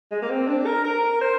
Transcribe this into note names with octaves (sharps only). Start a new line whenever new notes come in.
G#3
A#3
C4
D4
A#4
A#4
C5